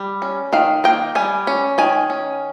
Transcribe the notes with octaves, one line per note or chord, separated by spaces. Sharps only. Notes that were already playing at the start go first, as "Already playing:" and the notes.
Already playing: G3
C#4
D#3 F5
A#3 G5
G3 G#5
C#4
D#3 G#5
C#4